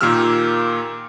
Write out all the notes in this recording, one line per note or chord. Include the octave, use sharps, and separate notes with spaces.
A#2 D#3 A#3 G4 E6 F6